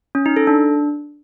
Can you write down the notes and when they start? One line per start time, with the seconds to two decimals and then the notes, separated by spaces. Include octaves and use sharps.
0.15 C#4
0.26 D#4
0.36 A4
0.47 D4